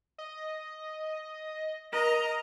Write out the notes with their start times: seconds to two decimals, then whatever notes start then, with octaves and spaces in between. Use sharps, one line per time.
0.18 D#5
1.93 A#4 D#5 A#5